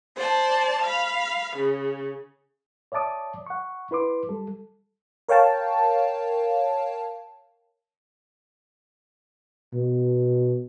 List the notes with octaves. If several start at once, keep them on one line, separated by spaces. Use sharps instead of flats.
C5 D5 A5
F5 B5
C#3
C#5 D5 E5 A5 D6 D#6
F#5 C#6
E4 B4 C6 D6
G3 A4
A#4 C#5 F5 G5 A5
B2